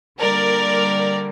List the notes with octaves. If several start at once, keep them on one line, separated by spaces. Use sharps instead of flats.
D3 G3 A#3 A#4 D5